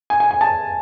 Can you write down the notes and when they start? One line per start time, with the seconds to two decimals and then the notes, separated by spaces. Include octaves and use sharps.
0.10 G#5
0.20 G#5
0.31 G#5
0.41 A5